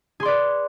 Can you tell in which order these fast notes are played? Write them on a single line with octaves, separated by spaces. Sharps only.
G#4 C6 D5 B4